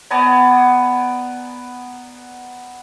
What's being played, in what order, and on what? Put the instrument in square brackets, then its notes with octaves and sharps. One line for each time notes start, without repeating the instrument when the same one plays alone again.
[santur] B3 D5 G#5 A#5